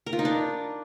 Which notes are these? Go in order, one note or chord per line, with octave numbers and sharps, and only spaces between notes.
A#4
F4
D#4
D4